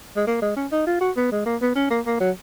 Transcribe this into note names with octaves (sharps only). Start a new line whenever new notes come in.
G#3
A#3
G#3
C#4
D#4
F4
F#4
B3
G#3
A#3
B3
C#4
A#3
A#3
F#3